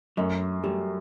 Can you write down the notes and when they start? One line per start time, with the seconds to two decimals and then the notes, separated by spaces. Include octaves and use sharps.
0.17 F#2 F#3 A3
0.64 F#3 G3 A3